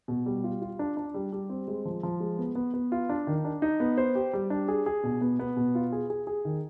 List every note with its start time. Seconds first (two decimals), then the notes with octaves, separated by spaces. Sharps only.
0.08 B2
0.26 G3
0.44 F4
0.62 F4
0.79 D4
0.97 D4
1.14 G3
1.32 G3
1.50 C4
1.68 G#3
1.85 F3
2.03 F3
2.20 G#3
2.38 B3
2.55 B3
2.74 B3
2.92 F4
3.09 D4
3.27 D#3
3.45 D4
3.62 D#4
3.80 B3
3.98 C5
4.15 G4
4.33 G3
4.50 D4
4.68 G#4
4.86 G#4
5.04 B2
5.21 B3
5.39 B3
5.57 B2
5.75 F4
5.92 G#4
6.10 G#4
6.27 G#4
6.45 D#3